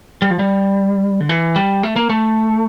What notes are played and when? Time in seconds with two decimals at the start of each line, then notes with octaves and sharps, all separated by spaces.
0.22 G3
0.31 F3
0.39 G3
1.20 D3
1.29 E3
1.56 G3
1.83 A3
1.96 A#3
2.10 A3